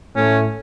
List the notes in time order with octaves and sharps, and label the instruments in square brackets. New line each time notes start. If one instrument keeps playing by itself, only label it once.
[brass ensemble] A2 A3 [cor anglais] C#4